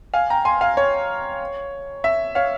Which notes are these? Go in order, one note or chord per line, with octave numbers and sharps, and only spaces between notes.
F5 G#5
G5 A#5
G#5 C6
F5 G#5
C#5
E5
C#5 F5